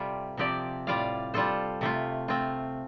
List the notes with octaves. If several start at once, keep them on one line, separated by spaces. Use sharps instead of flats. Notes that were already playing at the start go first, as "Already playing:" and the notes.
Already playing: C3 G3 F4 A4
C3 F3 C4 G4 D5
A2 G3 F4 D5 F5
G3 F4 A4 C5
C3 A3 F4
A3 C4 F4